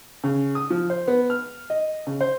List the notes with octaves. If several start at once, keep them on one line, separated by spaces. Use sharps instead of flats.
C#3
D#6
F3
C5
B3
F6
D#5
C#3
C5